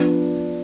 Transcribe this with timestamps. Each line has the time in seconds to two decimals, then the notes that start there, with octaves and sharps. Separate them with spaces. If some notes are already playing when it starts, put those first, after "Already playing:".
Already playing: F3 B3 D4